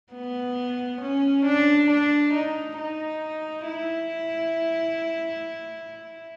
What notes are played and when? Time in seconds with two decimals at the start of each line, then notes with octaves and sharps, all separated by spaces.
0.13 B3
1.01 C#4
1.46 D4
1.90 D4
2.34 D#4
2.78 D#4
3.66 E4